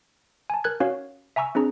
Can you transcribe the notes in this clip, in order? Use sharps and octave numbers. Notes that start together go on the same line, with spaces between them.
G#5 A5
A#4 F#6 G#6
C#4 F#4 C#5 F5
E5 G#5 A#5 C#6 E6
C4 D4 G#4 A#5